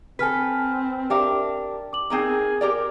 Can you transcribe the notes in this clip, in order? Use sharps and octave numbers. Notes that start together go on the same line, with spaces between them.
C4 A4 B4 G#5 F6 B6
D4 G4 A#4 E5 G5 D6
D6 F#7
C4 D#4 G#4 A#4
G4 A#4 D5